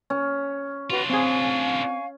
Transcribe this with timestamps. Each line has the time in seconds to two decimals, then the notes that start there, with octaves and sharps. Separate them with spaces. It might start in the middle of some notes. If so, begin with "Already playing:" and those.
0.10 C#4
0.90 D4 F4 F#4 B4
1.10 C4 G#4 F5 G#5 C#6